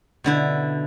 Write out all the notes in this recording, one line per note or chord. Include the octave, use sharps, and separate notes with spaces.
B2 D3 E4